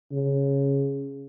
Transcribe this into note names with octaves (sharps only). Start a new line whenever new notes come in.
C#3